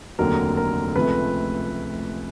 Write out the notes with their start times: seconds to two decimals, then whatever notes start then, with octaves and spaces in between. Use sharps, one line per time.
0.19 F1 D#2 D3 F#3 A#4
0.57 A#4
0.96 C#2 C3 F3 A3 B4